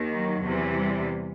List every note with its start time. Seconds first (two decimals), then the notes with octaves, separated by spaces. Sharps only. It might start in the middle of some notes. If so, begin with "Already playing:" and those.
Already playing: D#2 D#3
0.13 F#3
0.43 E2 C3 E3
0.75 G3